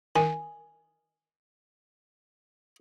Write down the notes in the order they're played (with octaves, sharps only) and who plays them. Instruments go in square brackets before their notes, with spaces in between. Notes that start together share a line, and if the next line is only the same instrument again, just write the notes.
[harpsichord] D#3 [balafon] G#5